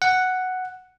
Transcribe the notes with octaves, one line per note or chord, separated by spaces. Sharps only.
F#5